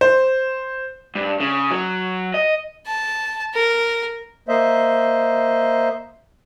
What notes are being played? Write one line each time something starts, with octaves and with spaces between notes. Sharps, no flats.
C5
G2
C#3
F#3
D#5
A5
A#4
A#3 C5 D#5 E5